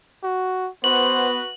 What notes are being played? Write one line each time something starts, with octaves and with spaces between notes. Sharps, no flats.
F#4
B3 F#4 B4 C5 F#7